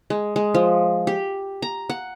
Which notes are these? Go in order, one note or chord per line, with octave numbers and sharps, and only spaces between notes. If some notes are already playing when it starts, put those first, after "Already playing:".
G#3
G#3
F3
G4
A#5
F#5